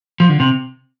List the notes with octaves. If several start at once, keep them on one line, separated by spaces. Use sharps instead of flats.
F3
D3
C3